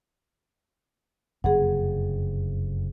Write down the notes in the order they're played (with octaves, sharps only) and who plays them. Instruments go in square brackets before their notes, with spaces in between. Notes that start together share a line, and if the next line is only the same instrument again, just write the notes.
[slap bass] F#1 F2 C3 [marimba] G#4 F#5